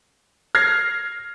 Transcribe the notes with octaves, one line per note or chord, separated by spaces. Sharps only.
F6 G#6 A#6 C7